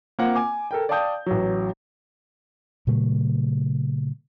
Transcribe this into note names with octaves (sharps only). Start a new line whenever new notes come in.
A#3 C4 F4 F#5
G#5 D6
A4 A#4 G5
D5 F5 G5 A5 D#6 G6
A1 F#3
A#2 C#3 F#3 A3